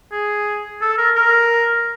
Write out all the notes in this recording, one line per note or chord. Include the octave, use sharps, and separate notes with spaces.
G#4
A4
A#4
A#4